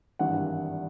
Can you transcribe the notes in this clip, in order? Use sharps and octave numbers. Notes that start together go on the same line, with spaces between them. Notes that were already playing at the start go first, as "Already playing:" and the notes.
G#1 G2 E3 G3 F#5